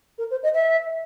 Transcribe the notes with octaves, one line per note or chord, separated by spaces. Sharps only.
A#4
C5
D#5
E5